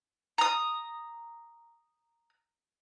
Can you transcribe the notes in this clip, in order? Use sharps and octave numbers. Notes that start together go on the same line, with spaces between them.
A#5 D#6